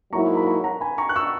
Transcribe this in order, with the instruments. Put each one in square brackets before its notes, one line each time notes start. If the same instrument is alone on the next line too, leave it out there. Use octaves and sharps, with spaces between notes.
[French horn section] G#2 F#3 A#3 E4 [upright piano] A#5 C#6
[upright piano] B5
A#5 C#6
F#5 A#5
G#5 B5
A#5 C#6
F#6
C#6 E6